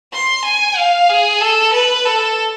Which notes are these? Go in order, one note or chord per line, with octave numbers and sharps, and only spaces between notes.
C6
G#5
F5
G#4
A4
B4
A4